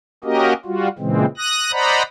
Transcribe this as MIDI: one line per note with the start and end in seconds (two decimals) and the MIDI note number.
0.24 0.53 58
0.24 0.53 61
0.24 0.53 66
0.24 0.53 67
0.24 0.53 70
0.24 0.53 75
0.65 0.88 55
0.65 0.88 65
0.65 0.88 66
0.99 1.25 46
0.99 1.25 49
0.99 1.25 52
0.99 1.25 56
0.99 1.25 60
1.37 1.72 87
1.37 1.72 90
1.37 1.72 94
1.72 2.03 72
1.72 2.03 74
1.72 2.03 75
1.72 2.03 78
1.72 2.03 82
1.72 2.03 83